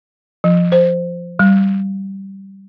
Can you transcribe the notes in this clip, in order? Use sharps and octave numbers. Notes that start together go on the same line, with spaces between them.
F3
C5
G3